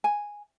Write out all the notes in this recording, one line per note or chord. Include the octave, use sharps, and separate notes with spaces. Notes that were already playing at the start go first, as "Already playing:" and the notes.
G#5